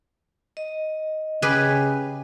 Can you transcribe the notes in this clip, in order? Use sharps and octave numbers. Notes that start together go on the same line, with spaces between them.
D#5
C#3 G4 G#4 B4